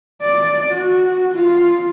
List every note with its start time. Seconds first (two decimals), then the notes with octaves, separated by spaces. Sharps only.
0.22 D5
0.71 F#4
1.32 F4